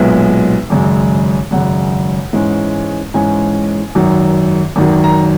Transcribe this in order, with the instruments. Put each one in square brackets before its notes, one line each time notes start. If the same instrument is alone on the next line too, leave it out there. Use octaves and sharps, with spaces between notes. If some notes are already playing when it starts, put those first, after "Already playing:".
Already playing: [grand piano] B1 A#2 G#3 B3 E5
G#1 F#2 C#3 G#3
G#1 F#2 C#3 G#3 F#5
G#2 E3 G#3 C#4
G#2 E3 G#3 C#4 G#5
G#1 F#2 D#3 F#3
G#1 F#2 D#3 F#3
A#5